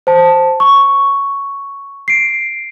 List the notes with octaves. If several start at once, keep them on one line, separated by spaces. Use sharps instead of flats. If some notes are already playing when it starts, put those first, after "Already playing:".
C5 A5
C#6
C7 D7